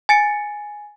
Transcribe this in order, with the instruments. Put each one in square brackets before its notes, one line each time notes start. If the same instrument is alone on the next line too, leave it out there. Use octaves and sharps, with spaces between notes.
[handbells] G#5 A6 C#7 D7